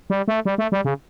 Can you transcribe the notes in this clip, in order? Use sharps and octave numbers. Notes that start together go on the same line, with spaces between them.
G3
A3
G3
A3
G3
C#3